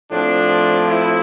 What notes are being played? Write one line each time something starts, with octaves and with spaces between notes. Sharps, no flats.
A2 F3 C4 D4
E4